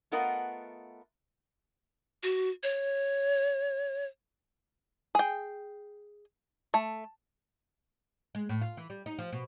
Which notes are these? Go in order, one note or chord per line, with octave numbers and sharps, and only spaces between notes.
A3 B3 F4 A#4 D#5 F#5
F#4
C#5
G#4 G5
A3
G#3
A2
F4
E3
G3
D#4
F3
B2